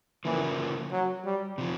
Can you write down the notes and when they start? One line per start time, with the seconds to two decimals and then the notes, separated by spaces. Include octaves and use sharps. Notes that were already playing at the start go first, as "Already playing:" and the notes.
0.25 C#3 E3 F3 A#3
0.92 F#3
1.25 G3
1.58 C3 F3